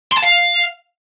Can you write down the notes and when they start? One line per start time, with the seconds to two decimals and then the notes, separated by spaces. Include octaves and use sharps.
0.12 C6
0.17 A5
0.22 F5